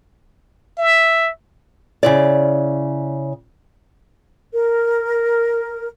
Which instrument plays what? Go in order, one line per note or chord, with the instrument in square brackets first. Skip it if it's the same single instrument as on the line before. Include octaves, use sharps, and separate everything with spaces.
[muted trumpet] E5
[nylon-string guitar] C#3 E4 D5
[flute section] A#4